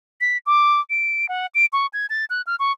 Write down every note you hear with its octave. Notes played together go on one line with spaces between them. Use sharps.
B6
D6
D7
F#5
D7
C#6
G#6
A6
F#6
F6
C#6